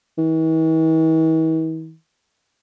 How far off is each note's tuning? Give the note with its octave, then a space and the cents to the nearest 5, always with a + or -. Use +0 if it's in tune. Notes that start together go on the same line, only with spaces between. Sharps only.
E3 -45